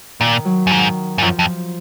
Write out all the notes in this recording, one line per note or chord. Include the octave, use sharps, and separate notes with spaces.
A#2 D#3
F#3
F#2
G#2 D#3
G#2
F#2 F3
F2